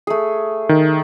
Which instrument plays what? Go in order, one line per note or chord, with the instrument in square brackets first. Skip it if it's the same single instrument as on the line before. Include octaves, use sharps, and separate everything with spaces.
[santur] A3 G#4
[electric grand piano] D#3